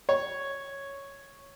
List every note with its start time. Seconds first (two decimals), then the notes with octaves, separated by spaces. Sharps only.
0.09 C#5